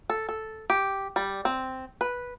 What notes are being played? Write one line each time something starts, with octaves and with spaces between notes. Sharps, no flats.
A4
A4
G4
G3
C4
B4